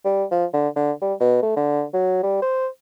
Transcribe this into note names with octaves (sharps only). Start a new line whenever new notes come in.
G3
F3
D3
D3
G3
B2
A3
D3
F#3
G3
C5